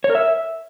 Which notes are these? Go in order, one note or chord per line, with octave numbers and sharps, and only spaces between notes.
C#5
A#4
E5